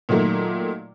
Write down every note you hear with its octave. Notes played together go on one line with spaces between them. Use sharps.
A#2 D#3 F#3 A3 A#3